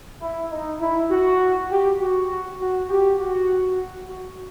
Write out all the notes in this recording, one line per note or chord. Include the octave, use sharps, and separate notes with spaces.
E4
D#4
E4
F#4
G4
F#4
F#4
G4
F#4
F#4